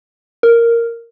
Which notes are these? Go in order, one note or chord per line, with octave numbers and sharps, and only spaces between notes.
A#4